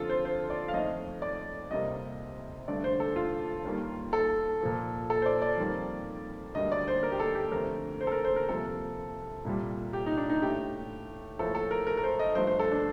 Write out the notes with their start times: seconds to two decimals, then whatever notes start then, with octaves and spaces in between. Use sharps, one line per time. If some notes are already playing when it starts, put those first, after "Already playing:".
Already playing: F2 D3 F3 F4 A4
0.09 C5
0.25 C5
0.50 D5
0.68 F5
0.73 F2 D#3 A3 D#5
1.22 D5
1.71 C2 C3 G3 A#3 D#5
2.68 G2 D3 A3 D5
2.84 C5
3.00 A4
3.16 F4
3.64 D#2 D#3 G3 A#3
4.13 A4
4.61 A#2 F3 A#3
5.10 A4
5.22 C5
5.26 D5
5.42 D5
5.58 F2 D#3 G3 A#3
6.55 D2 D3 G3 A#3 D#5
6.72 D5
6.88 C5
7.03 A#4
7.12 G4
7.20 A4
7.35 G4
7.52 F2 D3 A3 A#4
8.01 C5
8.07 A4
8.12 A#4
8.25 C5
8.36 A#4
8.49 C2 C3 F3 A#3 A4
9.45 C2 A#2 G3
9.93 G4
10.06 D#4
10.17 D4
10.29 D#4
10.42 A2 A3 G4
11.39 A2 F3 A#3 A4
11.55 A4
11.71 A#4
11.87 A#4
11.97 A#4
12.04 C5
12.19 D#5
12.35 G2 F3 A3 C5
12.47 C5
12.59 A4
12.72 D4